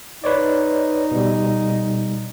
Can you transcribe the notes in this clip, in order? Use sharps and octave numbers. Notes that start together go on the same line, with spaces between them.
D#4 B4 C#5 D5
B2 G3